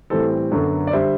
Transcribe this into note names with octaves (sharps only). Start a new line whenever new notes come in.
A2 E3 G3 C4 A4
F#2 D3 F#3 B3 A4
D5
D3 G3 C5 E5